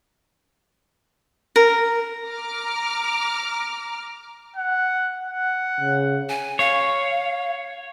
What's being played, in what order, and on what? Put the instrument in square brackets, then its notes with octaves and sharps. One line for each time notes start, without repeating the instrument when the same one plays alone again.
[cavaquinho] A#4
[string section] A#5 D6 F6
[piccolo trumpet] F#5
F#5
[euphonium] C#3
[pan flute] G#5
[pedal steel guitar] C#5 [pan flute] F5